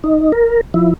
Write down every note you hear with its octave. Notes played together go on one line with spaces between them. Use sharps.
D#4
A#4
F3 E4